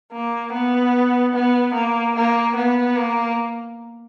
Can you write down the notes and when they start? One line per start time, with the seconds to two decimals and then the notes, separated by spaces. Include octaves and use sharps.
0.13 A#3
0.53 B3
1.34 B3
1.75 A#3
2.16 A#3
2.56 B3
2.96 A#3